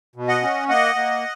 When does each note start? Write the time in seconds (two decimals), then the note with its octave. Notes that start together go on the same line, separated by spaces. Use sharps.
0.16 B2
0.28 D#5 F#5
0.42 C#4
0.69 A#3 D#5 F#5
0.96 A#3